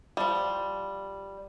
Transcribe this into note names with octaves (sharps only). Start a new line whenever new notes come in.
F3 G3